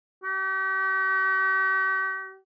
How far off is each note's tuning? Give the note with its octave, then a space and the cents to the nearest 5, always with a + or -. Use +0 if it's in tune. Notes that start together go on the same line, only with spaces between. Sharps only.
G4 -45